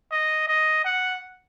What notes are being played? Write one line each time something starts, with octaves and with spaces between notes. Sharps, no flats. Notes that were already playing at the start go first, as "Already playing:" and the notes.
D#5
D#5
F#5